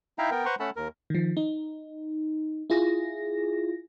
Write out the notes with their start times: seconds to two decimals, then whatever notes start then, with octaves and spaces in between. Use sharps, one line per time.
0.19 D#4 E4 E5 F5 G5 A#5
0.31 B3 A#4 G5
0.45 B4 C5 F#5 A#5 C6 C#6
0.60 A3 C#4 A4 F#5 A5 B5
0.76 D#2 A#4
1.10 D#3 F3
1.37 D#4
2.70 E4 F4 G#4 A#6